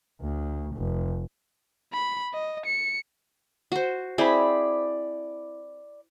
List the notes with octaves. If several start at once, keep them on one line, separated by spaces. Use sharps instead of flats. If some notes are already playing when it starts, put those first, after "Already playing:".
D2
F1
B5
D#5
C#7
F#4 C5
C4 E4 G#4 D5 B5